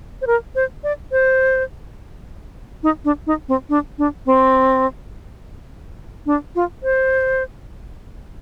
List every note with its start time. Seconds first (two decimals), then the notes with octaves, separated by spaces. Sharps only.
0.22 C5
0.27 A#4
0.55 C5
0.84 D5
1.12 C5
2.83 D#4
3.05 D4
3.27 D#4
3.48 C4
3.69 D4
3.98 D4
4.26 C4
6.26 D4
6.55 F4
6.83 C5